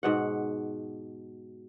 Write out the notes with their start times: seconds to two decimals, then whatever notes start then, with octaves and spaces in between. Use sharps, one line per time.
0.03 G#2 B2 F#5